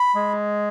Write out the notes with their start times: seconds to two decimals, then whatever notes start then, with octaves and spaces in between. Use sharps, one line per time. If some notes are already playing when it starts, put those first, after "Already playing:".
Already playing: B5
0.15 G#3